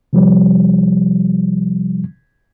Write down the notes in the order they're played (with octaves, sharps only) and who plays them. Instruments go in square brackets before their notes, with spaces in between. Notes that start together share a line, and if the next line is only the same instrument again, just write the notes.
[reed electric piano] C3 F3 G3